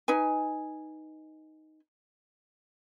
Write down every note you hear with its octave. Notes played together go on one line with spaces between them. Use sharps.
D#4 B4 G#5